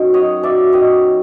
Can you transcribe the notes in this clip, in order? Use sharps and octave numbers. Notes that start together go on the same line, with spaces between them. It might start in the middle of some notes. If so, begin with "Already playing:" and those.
Already playing: F#2 D#3
F#3 C#5 D#5
F#2 D5 E5
D#3 C#5 D#5